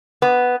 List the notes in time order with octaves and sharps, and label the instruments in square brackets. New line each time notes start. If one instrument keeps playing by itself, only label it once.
[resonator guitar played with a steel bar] B3